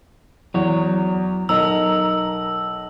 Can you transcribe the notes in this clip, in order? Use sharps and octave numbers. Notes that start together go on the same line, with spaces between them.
E2 F#3 C#5
B1 A#4 D#5 E6